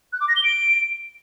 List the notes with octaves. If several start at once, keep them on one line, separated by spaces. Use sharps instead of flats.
F#6
D6
A#6
G7
D7